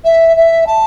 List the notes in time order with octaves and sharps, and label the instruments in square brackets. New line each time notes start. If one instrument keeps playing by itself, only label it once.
[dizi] E5
E5
A5